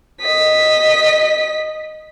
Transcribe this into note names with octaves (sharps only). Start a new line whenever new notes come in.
D#5 B6